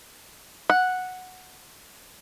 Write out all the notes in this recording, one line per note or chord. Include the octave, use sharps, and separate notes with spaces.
F#5